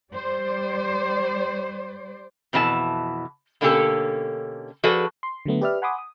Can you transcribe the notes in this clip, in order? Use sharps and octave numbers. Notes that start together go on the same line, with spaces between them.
G3 C5 D5
F2 B2 E3 E4 A5
B2 D3 A#3 C#4 G4 A4
F3 F#4 G#4 A4 B4 D5
C6
D3 F#3 A3 B3
G4 B4 D5 E5 F6
F#5 G#5 B5 C6 D6 D#6
D#6